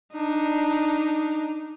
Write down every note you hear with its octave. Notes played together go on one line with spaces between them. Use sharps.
D4 D#4